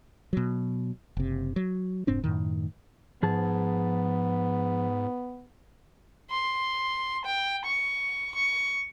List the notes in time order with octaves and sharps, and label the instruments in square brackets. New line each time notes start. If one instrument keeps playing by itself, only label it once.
[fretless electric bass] B2 F#3
F#1 C3
F#3
F1 G#2 C4 D4
F#2 A2 D#3
[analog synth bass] G#2 [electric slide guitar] F3 G#4 A5 [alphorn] B3
[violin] C6
G5
C#6
C#6